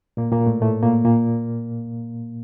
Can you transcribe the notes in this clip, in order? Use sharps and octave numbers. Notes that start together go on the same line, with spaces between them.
A#2 A#3
A#2 A#3
A2 A3
A2 A3
A#2 A#3
A#2 A#3